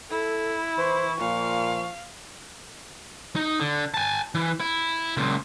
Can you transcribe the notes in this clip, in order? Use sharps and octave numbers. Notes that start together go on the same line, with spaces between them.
E4 A4
E3 C5 C#6
A#2 F3 F5
D#4
D3
G#5 A5
E3
E4
C#2 A#2